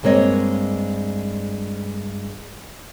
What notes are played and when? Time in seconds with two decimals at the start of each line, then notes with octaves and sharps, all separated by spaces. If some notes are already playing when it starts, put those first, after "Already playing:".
0.03 G2 G#3 A#3 C4 C#5 D#5